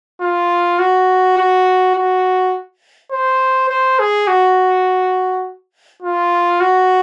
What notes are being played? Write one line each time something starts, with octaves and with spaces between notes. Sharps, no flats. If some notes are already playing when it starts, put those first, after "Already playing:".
F4
F#4
F#4
F#4
C5
C5
G#4
F#4
F4
F#4